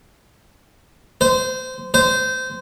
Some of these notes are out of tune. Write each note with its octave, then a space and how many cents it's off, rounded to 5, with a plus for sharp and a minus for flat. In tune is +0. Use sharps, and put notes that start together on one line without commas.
C5 -25
C5 -25